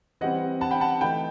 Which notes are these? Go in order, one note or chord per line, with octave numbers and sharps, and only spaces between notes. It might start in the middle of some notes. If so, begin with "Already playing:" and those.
E3 G3 C4 D#5 F#5
F#5 A5
G5 B5
F#5 A5
E3 A3 D#4 G5 B5